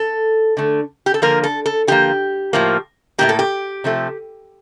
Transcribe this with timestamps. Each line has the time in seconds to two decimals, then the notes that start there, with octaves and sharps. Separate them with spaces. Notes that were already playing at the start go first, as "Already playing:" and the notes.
Already playing: A4
0.57 D3 A3
1.06 G4
1.14 A4
1.22 D3 F3 A#3 A#4
1.44 A4
1.66 A4
1.87 D3 F3 A#3 G4
2.53 A2 F3 A#3
3.18 A2 F3 A#3 G4
3.29 A4
3.39 G4
3.84 C3 F3 A3